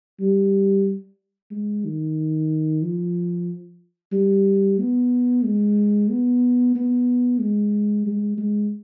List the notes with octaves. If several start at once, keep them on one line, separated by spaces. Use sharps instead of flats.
G3
G#3
D#3
F3
G3
B3
G#3
B3
B3
G#3
G#3
G#3